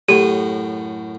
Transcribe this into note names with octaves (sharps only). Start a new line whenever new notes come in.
F#2 A2 G4